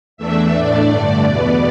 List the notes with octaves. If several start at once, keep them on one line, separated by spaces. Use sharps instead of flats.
E2 E3 A3 D4 E5
A2 A3 D4 D5
G2 D3 A3
E2 B2 B3 D5